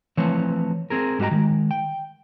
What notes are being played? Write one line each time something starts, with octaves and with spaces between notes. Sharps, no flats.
E3 F3 A3 C4 B4 C#5
C4 G#4 A#4
G#2 G3 F#4 D#5 G5 A#5
D#3 G#3
G5